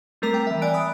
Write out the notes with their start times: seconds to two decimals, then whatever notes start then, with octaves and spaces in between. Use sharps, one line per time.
0.22 G3 A3 C4 A#4 A#5 B6
0.34 G5
0.47 E3 E5
0.62 D5 G#5 F#6 D7
0.74 B5 D#6